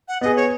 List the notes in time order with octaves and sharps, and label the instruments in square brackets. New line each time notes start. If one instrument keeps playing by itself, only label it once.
[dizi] F#5
[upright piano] B3 G#4 [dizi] D#5
[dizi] C#5